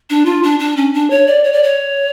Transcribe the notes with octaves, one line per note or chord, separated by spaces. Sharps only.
D4
F4
D4
D4
C#4
D4
C#5
D5
C#5
D5
C#5